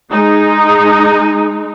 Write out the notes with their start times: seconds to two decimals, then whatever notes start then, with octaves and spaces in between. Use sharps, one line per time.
0.11 G#3 D#4